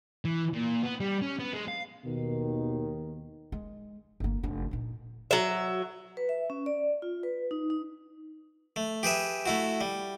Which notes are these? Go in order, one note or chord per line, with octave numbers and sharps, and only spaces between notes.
E3
A#2
B3
G3
C#4
B3
G#3
F5
D#2 B2 D#3
G#3
G1 A#3
F1 D4
A#2 D#4
F#3 E5
B4
E5
C#4
D5
F4
B4
D#4
D#4
A3
G4 G#4 B4 E5
A3 E4 F#4
G3